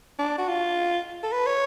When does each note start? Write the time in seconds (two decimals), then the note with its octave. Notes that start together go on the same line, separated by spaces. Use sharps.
0.19 D4
0.38 F#4
0.48 F4
1.23 A4
1.33 B4
1.46 C#5